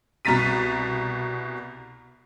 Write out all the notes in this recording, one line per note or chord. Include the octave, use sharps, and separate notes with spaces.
C2 B2 A#5 A6 B6 D#7